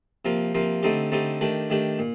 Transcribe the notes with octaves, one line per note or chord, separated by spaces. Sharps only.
C3 F3 A#3 F4
C3 F3 A#3 F4
D3 A3 C4 D#4 G4
D3 A3 C4 D#4 G4
D#3 A3 D4 G4
D#3 A3 D4 G4
A#2